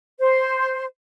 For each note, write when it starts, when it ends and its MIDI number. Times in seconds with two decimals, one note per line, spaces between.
0.19 0.85 72